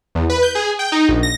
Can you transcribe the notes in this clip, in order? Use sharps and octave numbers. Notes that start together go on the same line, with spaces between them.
E2
B4
G6
G#4
G5
D#4
A#1
A#6